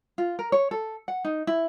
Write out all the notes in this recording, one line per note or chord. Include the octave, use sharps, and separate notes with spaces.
F4
A#4
C#5
A4
F#5
D#4
E4